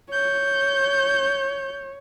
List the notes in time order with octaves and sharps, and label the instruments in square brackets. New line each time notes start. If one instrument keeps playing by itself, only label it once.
[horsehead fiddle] C#5 [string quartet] G6